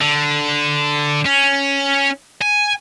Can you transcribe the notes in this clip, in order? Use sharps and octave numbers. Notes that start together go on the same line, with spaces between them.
D3
C#4
G#5